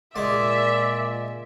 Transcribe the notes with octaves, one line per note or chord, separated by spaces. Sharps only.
A#2 G#3 D5 E5